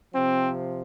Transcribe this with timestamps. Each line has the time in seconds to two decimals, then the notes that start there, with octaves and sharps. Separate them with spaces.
0.14 C3 F3 C4